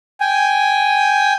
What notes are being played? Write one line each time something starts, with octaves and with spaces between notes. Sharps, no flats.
G5 G#5